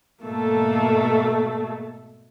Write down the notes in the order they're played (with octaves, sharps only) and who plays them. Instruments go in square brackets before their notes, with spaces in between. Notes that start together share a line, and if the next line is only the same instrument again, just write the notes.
[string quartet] G#2 B2 A3 [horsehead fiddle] A#3 A4